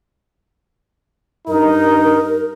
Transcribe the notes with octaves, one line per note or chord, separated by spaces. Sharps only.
G2 D#4 A#4